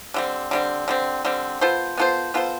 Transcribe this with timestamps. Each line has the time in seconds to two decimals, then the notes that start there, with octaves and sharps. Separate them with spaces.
0.14 D3 G3 C4
0.51 D3 G3 C4
0.88 D3 G3 C4
1.25 D3 G3 C4
1.61 B3 F4 A4 C5
1.97 B3 F4 A4 C5
2.34 B3 F4 A4 C5